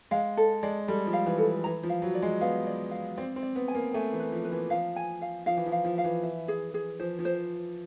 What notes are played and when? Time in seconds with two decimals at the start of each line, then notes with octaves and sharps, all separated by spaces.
0.11 G#3 F5
0.37 A4
0.63 G#3 D5
0.88 G3 A4
1.07 F3
1.13 F5
1.26 E3
1.38 A4
1.64 E3 A#5
1.83 F3
1.89 F5
2.02 F#3
2.15 D5
2.22 G#3
2.41 B3 F5
2.67 D5
2.91 F5
3.17 C4 D5
3.36 C4
3.42 D5
3.56 B3
3.68 G#5
3.75 A#3
3.94 A3 G#5
4.13 E3
4.20 B4
4.32 F3
4.44 B4
4.52 E3
4.70 F3 F5
4.96 G#5
5.21 F5
5.46 F3 F5
5.57 E3
5.66 F3
5.72 F5
5.85 F3
5.98 F5
6.04 E3
6.23 E5
6.48 G#4
6.74 G#4
7.00 F3 C5
7.19 F3
7.25 C5